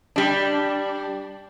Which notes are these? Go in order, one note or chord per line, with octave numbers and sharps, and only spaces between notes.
G3 D4